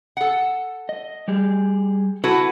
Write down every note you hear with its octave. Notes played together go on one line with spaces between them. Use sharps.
A4 F#5
D#5
G3 G4 G#4
E4 F#4 A4 B4 F#5 A5